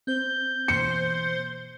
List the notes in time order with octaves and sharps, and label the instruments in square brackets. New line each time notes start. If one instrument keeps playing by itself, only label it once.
[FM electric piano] C4 C5 [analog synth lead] G6
[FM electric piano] B2 E3 A#3 [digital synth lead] C5 [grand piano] C#7